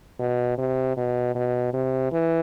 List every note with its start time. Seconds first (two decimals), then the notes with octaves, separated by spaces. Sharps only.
0.20 B2
0.58 C3
0.97 B2
1.35 B2
1.73 C3
2.12 E3